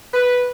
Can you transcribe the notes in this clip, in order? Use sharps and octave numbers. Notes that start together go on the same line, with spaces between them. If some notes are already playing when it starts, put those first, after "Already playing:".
B4